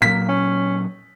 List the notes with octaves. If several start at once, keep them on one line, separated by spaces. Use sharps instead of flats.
A#2 F#3 A#3 B6
C#4